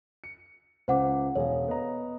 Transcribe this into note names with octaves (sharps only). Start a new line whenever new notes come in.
C#7
C#2 C5 F#5 D6
E1 G#4 C#5 F5
B3 D#5 A#5